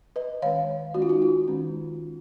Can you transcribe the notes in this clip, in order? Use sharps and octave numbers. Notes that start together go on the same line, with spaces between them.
B4 D#5
D#3 G#3 C#4 C#5 F5
D#3 G#3 C#4 F#4
F4
D#4 F#4
F4
D#3 G#3 C#4